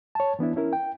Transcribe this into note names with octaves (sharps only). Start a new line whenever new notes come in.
C#5 A5
E3 B3 D4 E4
C#4 E4 A#4
G5